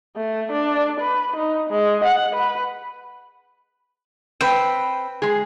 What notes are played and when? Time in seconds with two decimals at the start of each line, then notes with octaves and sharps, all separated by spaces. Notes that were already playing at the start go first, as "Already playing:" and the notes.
0.16 A3
0.52 D4
1.00 B4
1.37 D#4
1.70 G#3
2.04 F#5
2.36 B4
4.41 C4 B4 G5
5.22 G#3 G#4